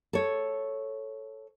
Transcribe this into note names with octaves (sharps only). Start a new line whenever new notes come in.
A4 C#5